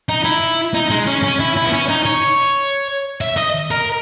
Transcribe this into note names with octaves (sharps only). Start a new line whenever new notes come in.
D#4
E4
D#4
G#3
C#4
C#4
E4
E4
B3
C#4
D#4
C#5
E5
D#5
A#4